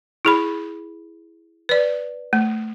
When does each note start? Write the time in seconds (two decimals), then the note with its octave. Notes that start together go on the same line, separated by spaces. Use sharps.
0.25 E4 G#4 B5
1.69 B4 D5
2.33 A3